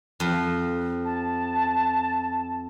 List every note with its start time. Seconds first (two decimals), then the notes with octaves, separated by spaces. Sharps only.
0.20 F2
1.05 A5